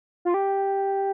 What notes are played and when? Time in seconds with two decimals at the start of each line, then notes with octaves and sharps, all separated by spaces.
0.25 F4
0.34 G4